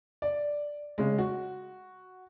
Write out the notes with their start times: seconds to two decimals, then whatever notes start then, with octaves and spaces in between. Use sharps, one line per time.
0.22 D5
0.98 C#3 G#3
1.18 F#4